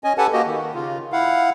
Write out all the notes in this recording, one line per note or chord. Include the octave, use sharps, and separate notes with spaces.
C#4 D#5 G#5
G4 A4 B4 F#5 G#5 A5
A#3 F#4 G4 D#5
D#3
C#3 F4
E4 F5 F#5